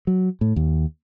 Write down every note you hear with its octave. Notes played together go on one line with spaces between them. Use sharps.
F#3
A2
D#2